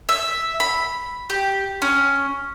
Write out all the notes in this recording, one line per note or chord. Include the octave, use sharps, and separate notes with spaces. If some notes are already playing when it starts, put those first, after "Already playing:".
E5
B5
G4
C#4